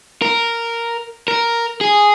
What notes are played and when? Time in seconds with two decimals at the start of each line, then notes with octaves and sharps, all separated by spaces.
0.22 A#4
1.28 A#4
1.81 G#4